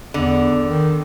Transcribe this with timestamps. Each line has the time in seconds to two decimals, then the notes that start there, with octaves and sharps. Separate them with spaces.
0.14 E2 D3
0.67 D#3